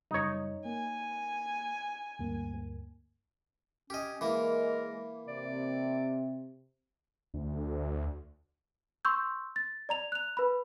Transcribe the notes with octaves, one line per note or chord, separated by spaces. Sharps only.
F#2 C#3 G3 D#4 C#5
A#3 G#5
D2 G2 A#3
C#4 G4 D#5
E3 G#3 A#3 A#4
C3 D5
D2
C6 C#6 E6 G6
A6
D5 A#5 F7
F#6 F7
B4 B5